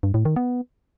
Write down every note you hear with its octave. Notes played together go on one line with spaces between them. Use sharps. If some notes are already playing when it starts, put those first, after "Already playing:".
G2
A2
D#3
B3